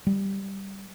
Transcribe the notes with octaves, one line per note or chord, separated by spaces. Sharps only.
G3